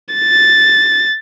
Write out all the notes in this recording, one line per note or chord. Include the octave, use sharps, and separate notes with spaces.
A6